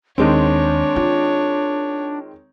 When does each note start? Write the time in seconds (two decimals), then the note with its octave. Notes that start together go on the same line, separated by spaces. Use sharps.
0.18 D#2 D#3 G#3 C4 D4 C#5
0.96 F4